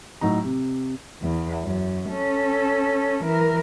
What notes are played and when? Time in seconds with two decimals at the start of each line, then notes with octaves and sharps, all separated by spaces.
0.21 A2 F#3 D#4 A#5
0.44 C3
1.22 E2
1.63 F#2
2.10 C#4 A4
3.24 E3 A#4